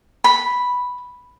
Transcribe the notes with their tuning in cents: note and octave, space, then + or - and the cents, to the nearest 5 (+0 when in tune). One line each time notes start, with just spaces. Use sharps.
B5 +0